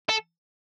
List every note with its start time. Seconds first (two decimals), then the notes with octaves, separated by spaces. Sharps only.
0.09 A4